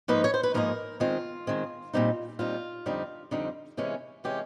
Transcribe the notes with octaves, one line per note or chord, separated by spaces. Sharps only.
G#2 F3 A#3 D#4 B4
C#5
C5
B4
G#2 F3 A#3 D#4 A#4
D#3 G#3 C4 F4
D#3 G#3 C4
A#2 G3 C4 D#4
A#2 G3 C4 D#4 F4
F2 D3 G3 C4 D#4
F2 D3 G3 C4 D#4
C3 E3 G#3 C#4
C3 E3 G#3 C#4 G4